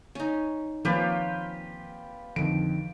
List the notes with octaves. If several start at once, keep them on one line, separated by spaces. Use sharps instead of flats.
C#4 D#4
D#3 F3 A#3 C4 C#4 F4 G4 B4
F2 D3 D#3 D7